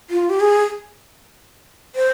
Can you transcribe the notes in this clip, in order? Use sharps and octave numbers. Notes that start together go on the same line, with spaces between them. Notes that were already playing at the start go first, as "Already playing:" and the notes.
F4
G4
G#4
C5